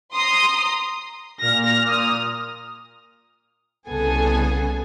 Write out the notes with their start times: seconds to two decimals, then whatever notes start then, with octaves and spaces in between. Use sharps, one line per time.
0.15 A#5 C6 D#6
1.41 A#2 F6 A#6
1.88 D#6
3.89 C2 C#3 B3 G#4 A4 G#5